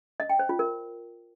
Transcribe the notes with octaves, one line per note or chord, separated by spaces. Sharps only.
D#5
G5
C5
F4
A#4